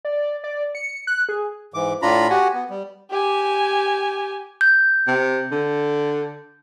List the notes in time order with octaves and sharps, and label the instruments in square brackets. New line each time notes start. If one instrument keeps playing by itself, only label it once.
[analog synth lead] D5
D5
C#7
F#6
G#4
[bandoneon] G#2 E3 D6
A2 D4 F4 A#5 B5
F#4 G4 F#5 G#5
B3
G3
[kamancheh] G4 G#5
[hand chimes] G6
[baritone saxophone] C3
D3